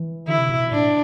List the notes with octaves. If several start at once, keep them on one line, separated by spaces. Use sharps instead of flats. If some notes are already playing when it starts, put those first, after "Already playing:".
Already playing: E3
D3 E4
C3
B2
B2
A2 D4